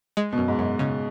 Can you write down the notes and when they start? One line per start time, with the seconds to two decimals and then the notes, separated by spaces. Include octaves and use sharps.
0.17 G#3
0.33 B2
0.38 F#2
0.48 G#2
0.59 F#2
0.79 C#3